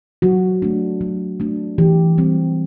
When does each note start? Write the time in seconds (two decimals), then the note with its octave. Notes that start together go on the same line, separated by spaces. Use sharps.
0.22 F#3 F#4
0.62 A3 D4
1.01 F#3
1.40 A3 D4
1.78 E3 G4
2.18 G3 C4